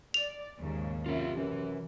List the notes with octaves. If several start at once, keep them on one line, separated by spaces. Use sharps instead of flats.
D5 F7
D#2 G#2 C#3
F#2 C3 F4 E5
F#2 E3